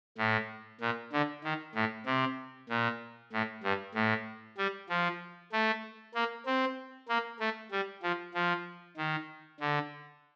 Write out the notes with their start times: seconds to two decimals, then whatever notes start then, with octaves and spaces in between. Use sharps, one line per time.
0.18 A2
0.81 A#2
1.12 D3
1.44 D#3
1.75 A2
2.06 C3
2.69 A#2
3.33 A2
3.63 G2
3.95 A2
4.58 G3
4.89 F3
5.52 A3
6.14 A#3
6.46 C4
7.09 A#3
7.40 A3
7.71 G3
8.02 F3
8.34 F3
8.97 D#3
9.60 D3